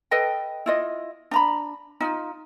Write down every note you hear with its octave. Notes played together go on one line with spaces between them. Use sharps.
A4 B4 D#5 G5
E4 F4 D#5
D4 A#5 B5
D#4 F4